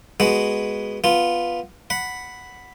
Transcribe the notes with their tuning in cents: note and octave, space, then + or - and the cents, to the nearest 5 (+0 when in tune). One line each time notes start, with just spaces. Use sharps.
G#3 +0 B3 +0 F#4 +0
B3 -5 F4 -5
F#5 +0 B5 +0